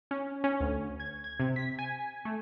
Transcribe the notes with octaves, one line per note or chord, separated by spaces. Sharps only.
C#4
C#4
D2
G#6
G#6
C3
B6
G#5
A3